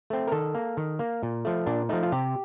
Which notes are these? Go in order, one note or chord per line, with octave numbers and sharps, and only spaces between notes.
A3 C4
A#4
D#3 A4
A#3
D#3
A#3
A#2
F3 A3
A#2 D4
F3 A3 D#4
F4
C3 G4